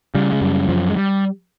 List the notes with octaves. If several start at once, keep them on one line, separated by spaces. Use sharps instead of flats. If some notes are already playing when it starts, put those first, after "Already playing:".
C#3 G3
G#3
F#2 G3
F#2 F3
G#3
G3